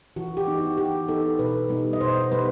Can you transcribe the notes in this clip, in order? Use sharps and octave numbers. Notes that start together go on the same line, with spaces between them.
E3 F#4
G4
B3 D#4
F#4
E3 G4
B3 D#4 A4
B2 B4
G3 B3 D#4
D#5
B2 C5
G3 B3 D#4 B4